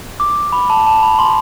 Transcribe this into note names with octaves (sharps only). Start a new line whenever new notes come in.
D6
B5
A5
A5
B5
C6